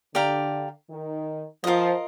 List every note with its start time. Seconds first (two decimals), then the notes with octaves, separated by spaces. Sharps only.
0.14 D3 G4 D5 F5 A#5
0.90 D#3
1.64 F3 F4 A#4 D#5